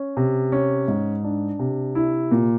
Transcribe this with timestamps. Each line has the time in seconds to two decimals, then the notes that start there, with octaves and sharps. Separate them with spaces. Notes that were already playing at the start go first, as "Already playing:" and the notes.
Already playing: C#4
0.17 C3
0.52 C#4
0.88 G#2
1.24 D4
1.59 C3
1.95 E4
2.31 A#2